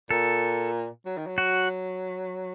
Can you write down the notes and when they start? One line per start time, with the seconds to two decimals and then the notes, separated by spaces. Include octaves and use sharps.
0.10 A#2 A4
1.05 F#3
1.17 D#3
1.27 F#3
1.38 F#4